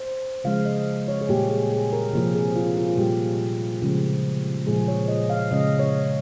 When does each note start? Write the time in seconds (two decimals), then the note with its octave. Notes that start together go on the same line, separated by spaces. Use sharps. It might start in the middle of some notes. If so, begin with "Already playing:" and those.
Already playing: C5
0.44 C#3 F3 G#3 F5
0.65 D#5
1.08 C#5
1.21 G#4
1.29 A#2 G3 A#3 G4
1.50 G#4
1.71 G#4
1.92 A#4
2.13 C3 F3 A#3
2.35 G#4
2.56 F4
2.77 F4
2.97 A#2 G3 A#3 G4
3.82 C#3 F3 G#3
4.66 A#2 F3 G#3 G#4
4.88 C#5
5.08 D#5
5.30 F5
5.52 C#3 G#3 D#5
5.79 C#5